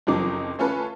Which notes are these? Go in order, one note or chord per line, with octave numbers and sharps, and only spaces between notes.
F#1 F2 F3 F#3 D#4 D6
A3 C#4 F4 A4 B4